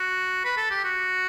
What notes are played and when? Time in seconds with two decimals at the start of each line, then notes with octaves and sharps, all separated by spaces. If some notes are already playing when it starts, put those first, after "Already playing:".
Already playing: F#4
0.45 B4
0.57 A4
0.71 G4
0.84 F#4